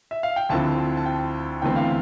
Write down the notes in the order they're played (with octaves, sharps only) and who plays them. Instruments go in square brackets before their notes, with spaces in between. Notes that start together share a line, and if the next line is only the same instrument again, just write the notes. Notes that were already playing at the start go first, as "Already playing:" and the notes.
[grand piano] E5
F5
G5
D2 D3 F3 C4 E4 A5
A5
A5
G5
E2 D3 A3 C4 E4 G5
F5